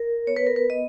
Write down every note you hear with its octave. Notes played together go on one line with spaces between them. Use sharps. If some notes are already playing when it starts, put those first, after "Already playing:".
Already playing: A#4
B3 C#5
B4
A#4
B4
B3 D#5